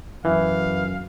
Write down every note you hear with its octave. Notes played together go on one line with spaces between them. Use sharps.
F#2 E3 F5